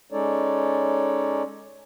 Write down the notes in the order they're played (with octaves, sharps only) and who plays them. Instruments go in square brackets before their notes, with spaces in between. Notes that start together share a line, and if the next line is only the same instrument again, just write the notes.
[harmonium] G#3 C#4 D#4 A4 C#5 D5